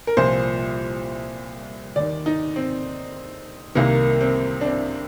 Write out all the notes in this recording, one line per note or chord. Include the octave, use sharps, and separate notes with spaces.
A#4
C2 A#2 F3 C5
D#2 D#3 D5
D#4
C4
C2 C3 D#3 A#3
C4
D4
C4